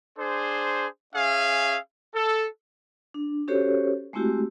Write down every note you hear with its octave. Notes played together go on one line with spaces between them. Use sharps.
D4 G#4 C5
C#4 G#4 E5 F5
A4
D4
C#4 F#4 G4 A4 C5 C#5
G#3 A3 C4 E4 F#4 G4